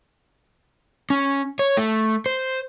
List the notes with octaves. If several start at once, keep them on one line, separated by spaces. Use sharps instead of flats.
C#4
C#5
A3
C5